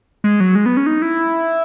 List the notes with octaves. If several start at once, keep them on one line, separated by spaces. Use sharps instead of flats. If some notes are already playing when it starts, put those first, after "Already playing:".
G#3
F#3
G#3
B3
C#4
D#4
E4